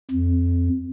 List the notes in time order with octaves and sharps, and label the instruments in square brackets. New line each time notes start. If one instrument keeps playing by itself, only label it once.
[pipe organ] F2